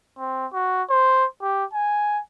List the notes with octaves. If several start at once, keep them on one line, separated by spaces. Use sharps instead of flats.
C4
F#4
C5
G4
G#5